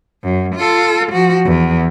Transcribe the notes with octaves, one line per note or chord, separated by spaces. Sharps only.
F#2
F4 A4
F3 F#4
E2